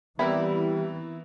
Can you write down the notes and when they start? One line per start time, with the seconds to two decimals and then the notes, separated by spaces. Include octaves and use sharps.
0.19 E3 G3 B3 C4 E4 A#4